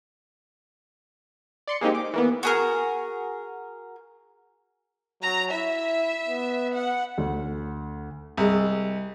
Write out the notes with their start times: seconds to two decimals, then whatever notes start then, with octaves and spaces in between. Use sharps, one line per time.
1.68 D5 C6 C#7
1.81 G#3 A#3 C4 D#4 G4
1.95 D6
2.14 E3 A#3 B3
2.43 F#4 G#4 A#4
5.23 F#3 A#5
5.52 E4 E5
6.28 B3
6.74 F#5
7.18 D2
8.37 C2 G#3